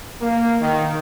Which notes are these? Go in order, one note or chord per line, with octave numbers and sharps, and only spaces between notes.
A#3
D#3